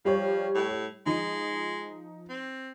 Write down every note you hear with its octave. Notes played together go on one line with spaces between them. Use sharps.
F3 G3 G4 C#5
A2
F3 G#3 D#4
C4